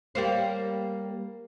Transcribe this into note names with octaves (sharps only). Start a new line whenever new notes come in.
G3 A#3 C5